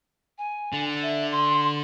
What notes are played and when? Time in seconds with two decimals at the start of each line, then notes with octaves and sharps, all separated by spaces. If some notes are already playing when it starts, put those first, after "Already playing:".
0.38 G#5
0.73 D3
1.02 E5
1.30 C6